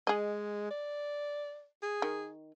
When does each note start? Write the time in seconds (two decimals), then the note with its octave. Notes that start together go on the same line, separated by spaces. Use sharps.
0.07 G#3 G#4 D#5
0.71 D5
1.82 G#4
2.02 D#3